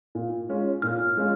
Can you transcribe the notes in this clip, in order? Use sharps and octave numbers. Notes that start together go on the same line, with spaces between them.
A#2
G#3 C#4 F4
A#2 F6
G#3 C#4 F4